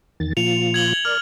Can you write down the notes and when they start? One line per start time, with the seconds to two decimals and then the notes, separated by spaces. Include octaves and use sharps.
0.20 E2 D#3 A6
0.37 A#2 F3 F4 C#7 F7
0.74 G#6 F#7 G7
1.05 A#4 D5 F6